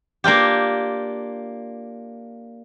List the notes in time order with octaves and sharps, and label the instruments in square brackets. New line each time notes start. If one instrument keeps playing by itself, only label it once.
[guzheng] A#3 D4 F4 G4